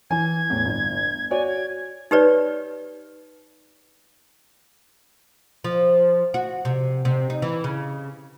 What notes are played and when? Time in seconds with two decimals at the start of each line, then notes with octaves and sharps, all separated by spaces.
0.10 E3 G#5 G#6
0.50 E2 A2
0.65 G1
1.31 F#4 C#5 D5 G#5
1.47 G#6
2.11 D#4 G4 B4 C#5 D5
5.64 F3
6.34 F#4
6.65 C3
7.05 C3
7.30 D#4
7.42 E3
7.64 C#3